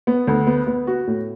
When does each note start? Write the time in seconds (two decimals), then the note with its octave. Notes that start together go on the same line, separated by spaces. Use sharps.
0.07 B3
0.27 D2
0.47 B3
0.67 B3
0.87 F#4
1.07 A2